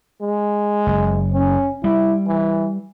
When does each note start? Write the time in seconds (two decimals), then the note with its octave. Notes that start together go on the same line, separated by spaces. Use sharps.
0.22 G#3
0.87 F#1
1.33 C#4
1.84 G3 E4
2.27 E3